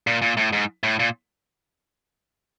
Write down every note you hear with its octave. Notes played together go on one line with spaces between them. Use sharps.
A#2
A#2
A2
G#2
A2
A#2